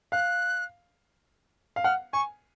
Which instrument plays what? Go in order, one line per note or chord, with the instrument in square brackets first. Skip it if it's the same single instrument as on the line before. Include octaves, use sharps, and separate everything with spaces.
[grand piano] F5 [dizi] F#6
[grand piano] F5
[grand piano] F#5 [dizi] F6
[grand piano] G#5 [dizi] C#6